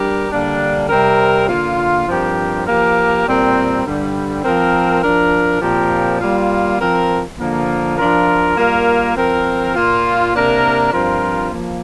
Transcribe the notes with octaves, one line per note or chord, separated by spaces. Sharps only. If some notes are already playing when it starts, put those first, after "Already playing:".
Already playing: G3 D4 G4 A#4
D3 G3 A#3 D4
C3 G3 C4 A#4
D3 A#3 F4
G2 F3 C4 G4 A#4
F3 A#3 G4 A#4
A#2 G3 C4 A#4
G2 D3 G3
F3 C4 A#4
F3 D4 A#4
A#2 F3 C4 G4 A#4
G3 A#3 F4
F3 C4 A#4
D3 F3 A#3
F3 D4 F4 A#4
G3 A#3 F4 A#4
F3 C4 A#4
A#2 A#3 F4
C3 A#3 D4 A#4
G2 F3 C4 F4 A#4
F3 A#3